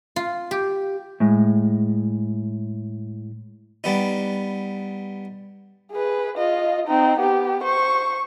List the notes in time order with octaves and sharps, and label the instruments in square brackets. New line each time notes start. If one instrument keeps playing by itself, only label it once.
[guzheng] F4
G4
[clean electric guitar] A2 G#3
[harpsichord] G3 B3 D#4
[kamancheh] G#4 B4
F4 D#5
C4 D#4
B3 G4
C5 C#6